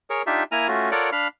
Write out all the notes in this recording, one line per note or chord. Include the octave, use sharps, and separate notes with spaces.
G#4 A#4 C#5
D4 D#4 F4 G4 E5
A#3 E4 G#5 A#5 F6
A3 C#4 F4 F#4
F4 A4 A#4 C#5 D5 F#5
D4 F5 B5 F6